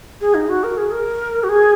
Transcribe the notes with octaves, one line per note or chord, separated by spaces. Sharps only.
G#4
D#4
F#4
A#4
G#4
A#4
F#4
G#4